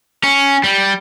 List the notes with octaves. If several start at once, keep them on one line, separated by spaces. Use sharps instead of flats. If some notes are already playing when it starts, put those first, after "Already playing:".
C#4
G3